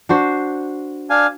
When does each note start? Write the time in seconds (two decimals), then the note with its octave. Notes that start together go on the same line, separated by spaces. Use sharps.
0.09 D4 F#4 C5
1.10 D4 F5 G#5